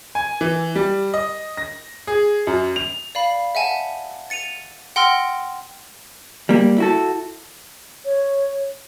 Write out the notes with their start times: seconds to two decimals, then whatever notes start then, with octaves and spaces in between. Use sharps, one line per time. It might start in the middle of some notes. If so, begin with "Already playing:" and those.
0.15 G#5
0.41 E3
0.76 G3
1.14 D#5
1.57 A#6
2.07 G#4
2.47 F#2
2.76 F7
3.15 D5 F5 B5
3.55 E5 F#5 G#5 A5
4.30 A6 C#7 D#7 F7
4.96 F#5 G5 C6 E6 F6 A#6
6.49 G3 A#3
6.78 E4 F#4 A4
8.05 C#5